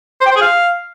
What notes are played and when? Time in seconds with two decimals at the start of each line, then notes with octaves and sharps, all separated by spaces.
0.21 C5
0.26 G5
0.31 C5
0.36 G#4
0.41 F5